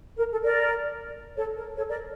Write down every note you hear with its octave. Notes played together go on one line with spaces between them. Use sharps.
A#4
A4
A#4 D5
A4 C#5
A#4
A4 C#5
A#4 D5